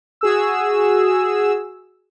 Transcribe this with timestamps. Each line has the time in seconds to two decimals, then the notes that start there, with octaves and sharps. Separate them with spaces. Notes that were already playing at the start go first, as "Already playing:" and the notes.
0.21 F#4 G#4 E6